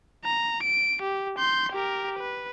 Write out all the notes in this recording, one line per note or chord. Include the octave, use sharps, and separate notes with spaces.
A#5
D7
G4
C6 G6
G4 A#4
B4